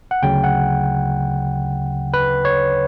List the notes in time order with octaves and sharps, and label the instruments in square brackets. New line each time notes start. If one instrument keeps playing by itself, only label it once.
[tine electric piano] F#5
D2 C#3 F#3 G5
F#5
B4
C#5